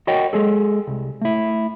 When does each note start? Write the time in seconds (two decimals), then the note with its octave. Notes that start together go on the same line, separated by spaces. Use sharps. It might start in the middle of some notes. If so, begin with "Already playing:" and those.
0.07 F#4 A#4 C#5 D#5 F#5 G5
0.33 G#3 G#4 A4
0.87 C2
1.21 A3 E4